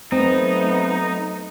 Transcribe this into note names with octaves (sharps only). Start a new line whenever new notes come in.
F#3 A3 B3 C4 D#4